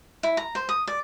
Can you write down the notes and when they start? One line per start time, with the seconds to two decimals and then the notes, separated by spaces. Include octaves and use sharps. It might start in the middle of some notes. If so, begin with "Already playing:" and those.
0.23 E4
0.37 A#5
0.55 C5
0.69 D#6
0.87 D5